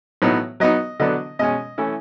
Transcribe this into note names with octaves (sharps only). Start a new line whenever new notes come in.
A2 F#3 B3 D#4
F#3 B3 D#4 D#5
D3 F#3 B3 D4 D#5
B2 G#3 C#4 D#5
E3 A3 C#4 E4